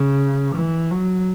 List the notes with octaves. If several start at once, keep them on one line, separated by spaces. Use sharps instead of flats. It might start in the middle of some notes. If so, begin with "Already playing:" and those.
Already playing: C#3
E3
F#3